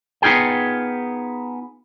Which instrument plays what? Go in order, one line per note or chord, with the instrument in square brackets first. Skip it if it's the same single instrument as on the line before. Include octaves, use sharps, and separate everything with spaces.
[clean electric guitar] B3 D#4 F4 G#4 G5